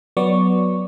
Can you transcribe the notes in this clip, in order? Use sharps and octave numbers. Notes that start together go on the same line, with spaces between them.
F#3 B3 D5 C#6